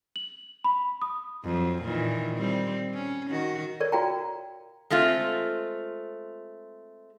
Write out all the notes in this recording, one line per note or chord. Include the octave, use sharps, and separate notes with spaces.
F#7
B5
D#6
F2 F#3
A#2 D#3 E3
G3 C4
C#4
D#3 F#4
A#4 C#5 D5
F#4 F5 G5 A#5
G#3 A3 C4 F4